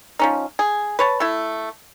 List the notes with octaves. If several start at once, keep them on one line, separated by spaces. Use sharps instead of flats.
F3 C#4 D#4
G#4
B4 C#5 A5
A3 E4